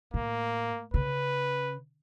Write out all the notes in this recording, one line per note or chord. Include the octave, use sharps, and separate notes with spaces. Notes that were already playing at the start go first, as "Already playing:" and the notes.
A2 A#3
C#3 B4